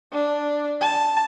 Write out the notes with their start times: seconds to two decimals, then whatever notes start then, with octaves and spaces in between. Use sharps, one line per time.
0.12 D4
0.81 A5